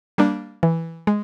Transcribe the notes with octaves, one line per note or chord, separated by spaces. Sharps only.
G3 A#3 D4
E3
G#3